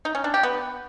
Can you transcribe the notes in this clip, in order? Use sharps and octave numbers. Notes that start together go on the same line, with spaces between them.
D#4
C#4
D4
G4
B3